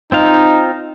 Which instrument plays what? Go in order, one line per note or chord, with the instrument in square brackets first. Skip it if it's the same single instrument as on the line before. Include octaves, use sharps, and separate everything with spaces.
[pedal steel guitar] C4 F4 F5 [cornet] D#4